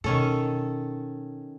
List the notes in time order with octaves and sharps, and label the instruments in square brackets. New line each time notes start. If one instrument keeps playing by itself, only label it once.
[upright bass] B2 [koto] D#3 C#4 A4